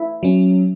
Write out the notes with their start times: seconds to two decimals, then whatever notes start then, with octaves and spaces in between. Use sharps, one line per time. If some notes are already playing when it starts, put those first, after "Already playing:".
Already playing: E4
0.23 F#3 C#4